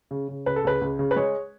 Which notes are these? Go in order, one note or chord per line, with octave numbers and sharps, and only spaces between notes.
C#3
C#3
C#2 B4
A4
C#2 B4
C#2
C#3
B4
G#3 C#5